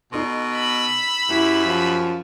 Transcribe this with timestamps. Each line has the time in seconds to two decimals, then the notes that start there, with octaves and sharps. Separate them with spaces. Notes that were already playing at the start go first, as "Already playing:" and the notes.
0.12 B2 D#4 A4 C6
0.54 B5 E6
1.29 F#2 E4 G4
1.66 F3